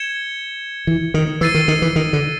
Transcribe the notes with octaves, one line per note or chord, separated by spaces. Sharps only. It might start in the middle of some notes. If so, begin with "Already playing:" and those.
Already playing: G#6 C#7 E7 G7
E3
D#3
E3 E6 A6 C7 D#7
D#3
D#3
E3
D#3
D3